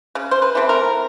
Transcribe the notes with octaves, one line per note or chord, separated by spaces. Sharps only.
C#3
C5
B4
E3 A3 C4
A#4